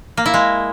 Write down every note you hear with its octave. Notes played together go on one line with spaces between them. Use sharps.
A#3
E4
G#3